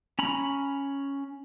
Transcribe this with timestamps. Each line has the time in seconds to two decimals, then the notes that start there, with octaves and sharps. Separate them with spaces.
0.19 C#4 A#5 B5